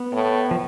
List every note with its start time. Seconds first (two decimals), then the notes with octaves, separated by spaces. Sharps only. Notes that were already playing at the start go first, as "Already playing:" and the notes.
Already playing: B3
0.12 A2
0.51 F3